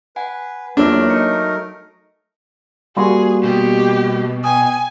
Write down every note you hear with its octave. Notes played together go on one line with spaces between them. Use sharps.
B4 F#5 G#5
E2 F#3 A3 A#3 D4 F4 A#4 C#5
D#4 C#7
G3 A#3 F#4 G#4 F5 B5 C6
B2 G4
G5 G#5 D#6